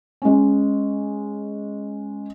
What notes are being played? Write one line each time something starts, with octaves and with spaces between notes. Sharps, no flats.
G#3 C#4